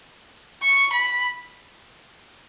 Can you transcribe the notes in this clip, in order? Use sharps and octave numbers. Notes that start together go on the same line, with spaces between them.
C#6
B5